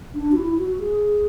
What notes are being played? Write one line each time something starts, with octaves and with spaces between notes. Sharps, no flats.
D4
F#4
E4
F#4
G#4